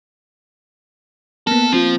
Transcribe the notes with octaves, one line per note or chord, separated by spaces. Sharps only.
A#3 B3 A4
F3 C4 F4